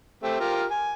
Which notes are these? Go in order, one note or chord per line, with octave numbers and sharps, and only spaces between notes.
A3 C4 G4
F4 G4 A#4
G#5